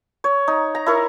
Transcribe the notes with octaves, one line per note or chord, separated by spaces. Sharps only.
C#5
D#4
A#5
E4 A#4 C#5